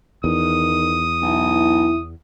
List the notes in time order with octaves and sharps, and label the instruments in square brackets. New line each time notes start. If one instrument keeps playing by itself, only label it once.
[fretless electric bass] E2 [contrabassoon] D#3 [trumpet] D#6
[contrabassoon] B1 [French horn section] E4